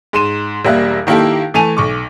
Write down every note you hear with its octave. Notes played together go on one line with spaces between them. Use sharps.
G#2 C6 D#7 E7
E1 G3 A#3 E5 F#6
D#3 A#3 E4 G4 A4
E3 A3 G#5 A5 D#7 F7
B1 C#6 D6